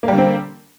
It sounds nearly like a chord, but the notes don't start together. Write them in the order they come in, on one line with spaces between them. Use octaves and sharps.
A#3 G3 D3 C4